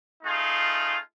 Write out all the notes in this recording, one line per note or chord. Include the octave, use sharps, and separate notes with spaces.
A3 D#4 F4 G#4